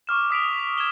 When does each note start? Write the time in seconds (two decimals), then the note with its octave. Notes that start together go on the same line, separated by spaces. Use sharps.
0.07 C#6 D6 F6 E7
0.31 D#6 B6 D7 F7
0.44 F7
0.59 B6
0.78 G#6 E7 G7